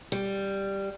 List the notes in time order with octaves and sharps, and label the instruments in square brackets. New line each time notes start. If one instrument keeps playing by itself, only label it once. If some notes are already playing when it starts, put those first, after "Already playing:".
[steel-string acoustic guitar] G3